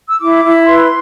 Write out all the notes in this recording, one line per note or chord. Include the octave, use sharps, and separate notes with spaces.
E6
E4 D6
E4
B5
B4 C6